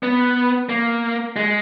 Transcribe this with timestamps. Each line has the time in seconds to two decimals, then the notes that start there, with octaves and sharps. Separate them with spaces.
0.03 B3
0.69 A#3
1.36 G#3